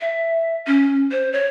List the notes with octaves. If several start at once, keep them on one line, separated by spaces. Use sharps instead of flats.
E5
C#4
C5
C#5